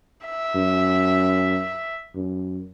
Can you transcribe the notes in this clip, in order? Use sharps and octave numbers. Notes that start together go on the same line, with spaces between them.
E5
F#2
F#2